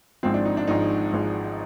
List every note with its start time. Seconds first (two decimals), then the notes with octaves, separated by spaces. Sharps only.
0.23 G#1 G#2 F3 G#3 C4
0.34 D4
0.46 D#4
0.57 D4
0.68 G#1 G#2 F3 G#3 D#4
1.13 G#1 G#2 F3 G#3